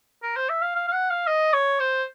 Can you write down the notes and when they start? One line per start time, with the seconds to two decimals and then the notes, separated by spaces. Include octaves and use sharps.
0.23 A#4
0.36 C5
0.49 E5
0.62 F5
0.75 F5
0.88 F5
0.93 F#5
1.10 F5
1.27 D#5
1.53 C#5
1.80 C5